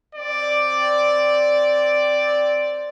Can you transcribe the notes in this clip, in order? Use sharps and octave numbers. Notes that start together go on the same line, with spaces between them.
C4 D5